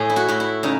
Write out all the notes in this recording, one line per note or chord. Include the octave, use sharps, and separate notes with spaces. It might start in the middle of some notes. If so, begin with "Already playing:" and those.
Already playing: A2 G#4
E4
F#4
A2 F#4
E4
C#3 D#4